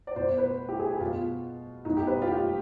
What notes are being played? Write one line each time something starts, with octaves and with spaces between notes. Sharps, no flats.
D5
B2 C5
B4
G4
G#4
G#4
B2 F4
B2 D#4
G4
B4
F4
G4